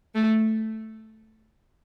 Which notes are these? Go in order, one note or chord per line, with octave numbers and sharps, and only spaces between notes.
A3